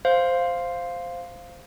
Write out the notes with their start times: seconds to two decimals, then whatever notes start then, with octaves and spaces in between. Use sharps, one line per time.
0.05 C5 F5